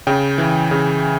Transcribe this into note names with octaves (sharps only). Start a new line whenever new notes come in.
C#3 G5
E3
C#3